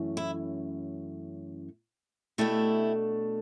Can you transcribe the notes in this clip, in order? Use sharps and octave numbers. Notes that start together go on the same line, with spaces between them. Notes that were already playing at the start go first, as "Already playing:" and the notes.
Already playing: F#2 E3 A3 C#4
E4
B2 A3 D4 E4 G4